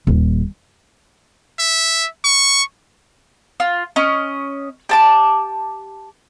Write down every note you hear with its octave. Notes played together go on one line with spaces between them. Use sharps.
D#1
E5
C#6
F4
C#4 D#5
G4 A5 D6